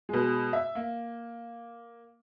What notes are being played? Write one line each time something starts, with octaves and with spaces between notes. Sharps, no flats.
B2 G#3
E5
A#3